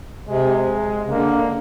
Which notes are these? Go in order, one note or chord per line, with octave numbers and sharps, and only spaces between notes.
C3 G#3
C#3
D3 A#3